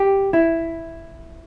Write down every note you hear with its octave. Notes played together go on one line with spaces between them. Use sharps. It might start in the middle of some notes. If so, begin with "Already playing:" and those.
Already playing: G4
E4